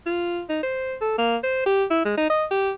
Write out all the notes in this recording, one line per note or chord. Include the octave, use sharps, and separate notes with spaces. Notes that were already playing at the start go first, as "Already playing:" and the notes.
F4
D#4
C5
A4
A#3
C5
G4
E4
G#3
D#4
D#5
G4